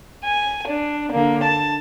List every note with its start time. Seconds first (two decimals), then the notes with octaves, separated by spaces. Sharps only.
0.24 G#5
0.68 D4
1.12 D3 A#3
1.43 A5